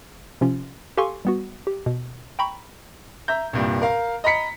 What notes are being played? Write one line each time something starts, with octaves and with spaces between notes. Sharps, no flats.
C3 F3 C#4 F4
G4 A4 F5 G#5 C6 C#6
G3 B3 F#4
G4
B2
G5 A#5 B5 C#6
E5 A#5 G6
C2 G2 A#2
A#4 F5
D#5 A#5 B5 B6 C#7